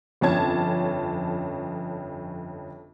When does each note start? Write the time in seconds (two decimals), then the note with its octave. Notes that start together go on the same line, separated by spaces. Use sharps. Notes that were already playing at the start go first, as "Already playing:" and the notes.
0.21 G1 F2 C#4 A5 G#6